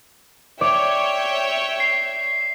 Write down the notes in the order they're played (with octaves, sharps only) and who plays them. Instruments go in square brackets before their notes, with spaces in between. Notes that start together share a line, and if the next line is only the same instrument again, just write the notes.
[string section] C#5 G5 [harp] D5 [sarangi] E5
[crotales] C7